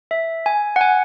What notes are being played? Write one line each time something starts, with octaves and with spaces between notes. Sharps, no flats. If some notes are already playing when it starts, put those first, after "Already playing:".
E5
G#5
F#5
G#5